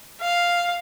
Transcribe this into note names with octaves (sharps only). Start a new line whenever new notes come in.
F5